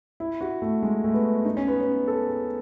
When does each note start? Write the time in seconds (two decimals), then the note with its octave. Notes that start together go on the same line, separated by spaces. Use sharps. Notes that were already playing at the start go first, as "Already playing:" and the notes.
0.20 E4
0.41 F#4
0.62 A3
0.83 G#3
1.04 A3
1.14 B3
1.45 D#4
1.57 C#4
1.68 B3
1.80 C#4
2.07 A4
2.28 G#4